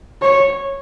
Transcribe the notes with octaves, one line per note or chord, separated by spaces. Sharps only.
C#5